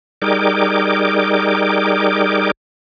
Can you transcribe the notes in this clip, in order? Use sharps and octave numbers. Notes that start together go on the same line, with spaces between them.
G3 D#4 G#4 A#4 G5 D6